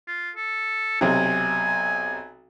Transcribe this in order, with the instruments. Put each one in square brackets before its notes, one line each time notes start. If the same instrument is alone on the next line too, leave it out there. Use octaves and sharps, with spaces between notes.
[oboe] F4
A4
[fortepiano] B1 C3 [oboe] G#5